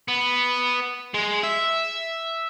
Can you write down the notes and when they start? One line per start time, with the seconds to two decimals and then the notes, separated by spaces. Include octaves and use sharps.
0.08 B3
1.14 G#3
1.43 E5